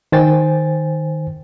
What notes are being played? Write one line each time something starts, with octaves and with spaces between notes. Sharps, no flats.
D#3 C5 G5 G#5 A6